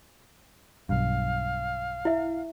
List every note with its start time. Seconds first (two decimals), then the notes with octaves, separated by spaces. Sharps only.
0.89 B1 G2 F5
2.05 E4 E5